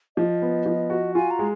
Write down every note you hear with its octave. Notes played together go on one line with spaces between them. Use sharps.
F3 D#5
B3
F3
F#4
F4 G#5
A#5
G#3